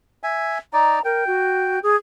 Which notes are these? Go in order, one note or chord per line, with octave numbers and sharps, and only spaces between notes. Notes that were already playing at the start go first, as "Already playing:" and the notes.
E5 G#5
D#4 D5 A#5
A#4 G5
F#4
G#4